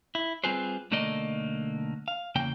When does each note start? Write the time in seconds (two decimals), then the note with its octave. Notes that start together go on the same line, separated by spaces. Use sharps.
0.15 E4
0.44 G3 C4 F4 G#4 B4 C5
0.91 B1 D3 A3 A#3 D5 D#5
2.08 F5
2.35 E2 C#3 A#3 G5